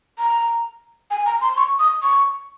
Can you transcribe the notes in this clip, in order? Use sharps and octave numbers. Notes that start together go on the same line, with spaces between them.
A#5
G#5
A#5
C6
C#6
D#6
C#6